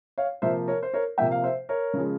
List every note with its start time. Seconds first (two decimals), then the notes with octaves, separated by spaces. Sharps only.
0.18 C#5 F5
0.42 C3 F3 A#3 C5 E5
0.68 A#4 C#5
0.83 C5
0.94 A#4 C#5
1.18 C3 F3 A#3 E5 G5
1.31 F5
1.43 C5 E5
1.69 A#4 C#5
1.94 C#3 F3 G#3